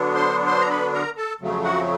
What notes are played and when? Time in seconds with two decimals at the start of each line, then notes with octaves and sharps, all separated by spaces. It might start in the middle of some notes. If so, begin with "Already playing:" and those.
Already playing: D3 F#3 B3 D4
0.15 C5 C6
0.46 C5 C6
0.61 A#5
0.70 B4 B5
0.93 A#4 A#5
1.17 A4 A5
1.41 F2 C#3 F#3 A3
1.63 F#4 F#5